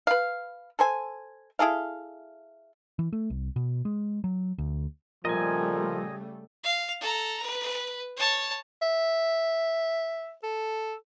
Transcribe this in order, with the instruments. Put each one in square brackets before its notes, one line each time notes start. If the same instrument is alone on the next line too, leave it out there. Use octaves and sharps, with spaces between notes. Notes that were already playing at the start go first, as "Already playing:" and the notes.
[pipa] B4 F5
A4 C5 G#5
E4 G#4 A4 F5
[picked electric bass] E3
A3
C2
B2
G#3
F#3
D2
[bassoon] A#2 [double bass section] C#3 G3 A3 [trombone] F3 [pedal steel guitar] D#5 G#5
[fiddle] F5
A4 A#5
B4
C#5 A5
[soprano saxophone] E5
A4